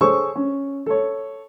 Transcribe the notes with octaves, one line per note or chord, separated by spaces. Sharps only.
G#4 A4 C5 C#5 C#6 E6
C#4
A4 C#5